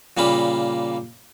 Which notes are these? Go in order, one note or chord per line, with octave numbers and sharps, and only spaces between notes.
A#2 C#3 G3 A#3 B5